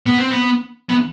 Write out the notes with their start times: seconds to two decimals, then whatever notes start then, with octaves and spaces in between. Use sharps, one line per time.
0.06 B3
0.18 C4
0.31 B3
0.89 B3